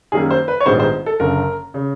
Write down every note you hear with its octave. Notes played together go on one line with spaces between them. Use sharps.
F#2 D#3 G3 A#3 G#4
C5
B4
C#5
A#1 G#2 D#3 G3 B3 C5
C5
A4
F#1 F#2 D3 A#4
C#3